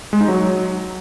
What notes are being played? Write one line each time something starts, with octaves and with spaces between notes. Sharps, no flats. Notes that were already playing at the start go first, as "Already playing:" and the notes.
G#3
D#4
F#3